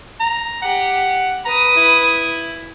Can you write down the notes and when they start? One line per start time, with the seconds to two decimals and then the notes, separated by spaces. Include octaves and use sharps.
0.20 A#5
0.62 G4 F#5
1.45 B4 A#5 D#6
1.77 E4